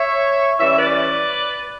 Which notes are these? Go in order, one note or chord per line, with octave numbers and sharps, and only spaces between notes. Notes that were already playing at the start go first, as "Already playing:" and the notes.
Already playing: C#5 E5
E3 G3 C#4 C#5 E5
B4 D5